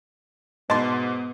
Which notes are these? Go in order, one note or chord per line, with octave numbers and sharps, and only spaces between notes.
G#2 B2 B3 D#5 A5 C6